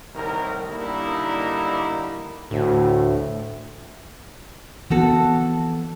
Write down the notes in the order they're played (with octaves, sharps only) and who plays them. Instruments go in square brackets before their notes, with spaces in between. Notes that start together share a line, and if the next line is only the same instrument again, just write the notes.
[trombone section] C2 A2 D#3 A#4
D3 G3 A#3 D#4 E4
[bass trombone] D2 [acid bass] A2
[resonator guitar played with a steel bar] F2 F#4 A4 [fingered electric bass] E3 B3